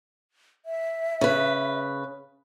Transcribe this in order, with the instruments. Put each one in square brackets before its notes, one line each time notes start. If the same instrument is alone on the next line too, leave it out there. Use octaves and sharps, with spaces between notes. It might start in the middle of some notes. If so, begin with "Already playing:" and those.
[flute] E5
[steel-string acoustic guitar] C#3 B4